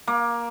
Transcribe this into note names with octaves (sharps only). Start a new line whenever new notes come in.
A#3